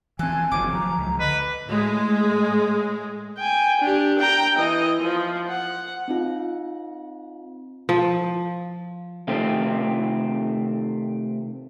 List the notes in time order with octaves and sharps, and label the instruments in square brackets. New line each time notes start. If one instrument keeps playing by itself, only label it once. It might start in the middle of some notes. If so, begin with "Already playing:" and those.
[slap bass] E3 C4 [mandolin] A4 F#6 [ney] G#5
[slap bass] F#1 D#3 F3 [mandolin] C4 C#4 D6
[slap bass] F3 F#3 [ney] A#5
[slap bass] C#2
[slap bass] D3 [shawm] B4 [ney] D#5
[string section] A2 G#3
[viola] G5 G#5
D4 G4
G5 A#5
E3 D#5
F3
F#5
[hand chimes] C4 D#4 F4
[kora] F3
[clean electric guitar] C3 D#3 A3 C4